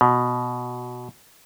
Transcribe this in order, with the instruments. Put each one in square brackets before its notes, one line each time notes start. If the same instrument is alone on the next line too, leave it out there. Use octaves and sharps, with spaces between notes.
[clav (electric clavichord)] B2